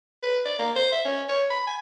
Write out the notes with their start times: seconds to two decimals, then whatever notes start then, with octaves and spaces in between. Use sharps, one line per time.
0.23 B4
0.45 D5
0.59 A#3
0.76 C5
0.92 E5
1.05 C#4
1.28 C#5
1.50 B5
1.67 G#5